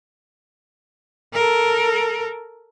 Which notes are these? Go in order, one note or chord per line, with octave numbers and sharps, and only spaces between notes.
A4 A#4